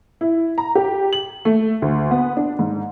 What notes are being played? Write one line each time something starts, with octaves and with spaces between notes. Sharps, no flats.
E4
A#5
G4
F#7
A3
D2
B3
D4
G#2